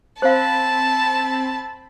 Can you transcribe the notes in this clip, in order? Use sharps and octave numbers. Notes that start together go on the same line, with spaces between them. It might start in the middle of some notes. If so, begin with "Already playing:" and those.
C4 C5 F5 A5 B5